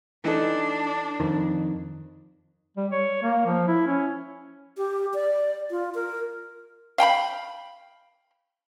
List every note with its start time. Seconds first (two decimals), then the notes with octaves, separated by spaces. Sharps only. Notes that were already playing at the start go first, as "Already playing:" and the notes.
0.24 E3 D4 D#4 A4
1.20 F2 D#3
2.77 G3
2.92 C#5
3.23 A#3
3.46 F3
3.68 E4
3.87 C#4
4.77 G4
5.14 D5
5.71 F4
5.95 A#4
6.98 F5 G5 A#5 B5